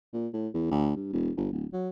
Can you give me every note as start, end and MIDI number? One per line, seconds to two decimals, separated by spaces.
0.13 0.28 46
0.33 0.48 45
0.54 0.69 40
0.71 0.92 38
0.96 1.12 43
1.13 1.30 28
1.37 1.48 31
1.52 1.66 26
1.73 1.89 54